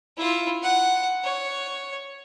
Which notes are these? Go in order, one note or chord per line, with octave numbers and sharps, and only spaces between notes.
E4 F4
F#5
C#5